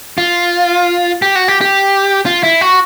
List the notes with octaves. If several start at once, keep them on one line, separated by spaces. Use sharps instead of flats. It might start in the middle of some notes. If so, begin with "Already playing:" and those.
F4
G4
F#4
G4
G4
F4
E4
F#4